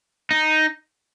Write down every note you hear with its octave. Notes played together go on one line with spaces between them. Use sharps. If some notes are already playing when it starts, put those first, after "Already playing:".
D#4